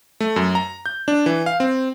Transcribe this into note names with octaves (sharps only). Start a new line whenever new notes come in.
A3
F#2
A#5
G6
D4
E3
F5
C4